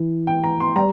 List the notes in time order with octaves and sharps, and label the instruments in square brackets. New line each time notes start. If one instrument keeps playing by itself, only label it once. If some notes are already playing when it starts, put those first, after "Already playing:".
Already playing: [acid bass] E3
[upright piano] G5
A#5
C6
[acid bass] G3 [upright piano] A#5